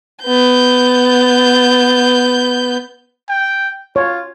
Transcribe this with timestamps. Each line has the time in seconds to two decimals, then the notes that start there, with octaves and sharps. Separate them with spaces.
0.23 B3 G6
3.29 G5
3.96 F4 C#5